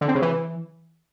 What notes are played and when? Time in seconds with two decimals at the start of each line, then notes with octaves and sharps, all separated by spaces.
0.01 D3
0.08 C4
0.15 C#3
0.22 E3